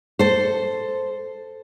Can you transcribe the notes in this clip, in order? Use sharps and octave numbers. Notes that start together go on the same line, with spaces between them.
A4 C5